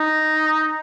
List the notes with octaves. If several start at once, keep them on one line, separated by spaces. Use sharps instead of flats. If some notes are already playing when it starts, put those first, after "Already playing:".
Already playing: D#4